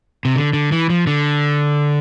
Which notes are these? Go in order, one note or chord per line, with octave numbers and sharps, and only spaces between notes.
C3
D3
D3
E3
F3
D3